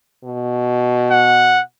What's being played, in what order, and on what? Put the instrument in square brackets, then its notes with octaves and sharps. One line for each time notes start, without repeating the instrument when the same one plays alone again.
[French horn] B2
[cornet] F#5